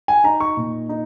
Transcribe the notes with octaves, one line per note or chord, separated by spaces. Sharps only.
G#5
D#4 A#5
C#6
A#2
D#4